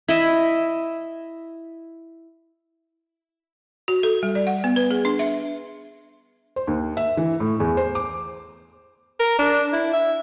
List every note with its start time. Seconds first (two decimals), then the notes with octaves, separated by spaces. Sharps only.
0.08 E4 D#5 E5
3.88 F#4
4.03 A4
4.23 G3
4.35 D5
4.47 F#5
4.64 B3
4.76 B4
4.91 G#4
5.05 D4
5.19 E5
6.56 C5
6.67 D#2
6.97 E5
7.17 E3
7.40 A2
7.60 E2
7.77 C5
7.95 D6
9.20 A#4
9.39 D4
9.73 E4
9.93 E5